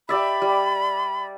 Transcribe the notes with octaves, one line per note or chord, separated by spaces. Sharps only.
G4 D5 E5 B5
G3